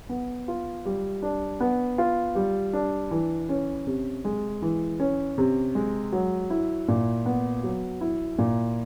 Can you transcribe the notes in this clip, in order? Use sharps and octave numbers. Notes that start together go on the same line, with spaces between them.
B3
F4
G3
D4
B3
F4
G3
D4
E3
C#4
C3
G#3
E3
C#4
C3
G#3
F#3
E4
A#2
B3
F#3
E4
A#2